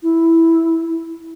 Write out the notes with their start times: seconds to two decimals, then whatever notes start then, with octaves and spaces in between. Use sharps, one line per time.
0.03 E4